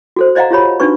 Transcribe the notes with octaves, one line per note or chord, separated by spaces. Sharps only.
F#4 A4 C5
C5 D5 D#5 F5 F#5 A#5
F4 G4 C#5 B5
D4 D#4 F#4 B4 C#6